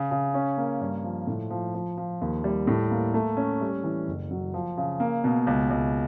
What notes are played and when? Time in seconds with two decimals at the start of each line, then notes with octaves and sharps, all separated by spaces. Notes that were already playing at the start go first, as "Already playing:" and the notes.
Already playing: C#3
0.11 C#3
0.34 C#4
0.57 A#3
0.81 G2
1.04 F3
1.27 A2
1.50 F3
1.74 F3
1.97 F3
2.21 D#2
2.44 G3
2.67 A2
2.91 A#3
3.14 A3
3.37 C#4
3.61 G3
3.84 E3
4.08 F#1
4.31 F#3
4.54 F3
4.77 C#3
5.00 A#3
5.24 B2
5.47 C#2
5.70 C#2